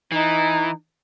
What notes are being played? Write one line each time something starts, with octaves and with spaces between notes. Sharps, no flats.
E3 D#4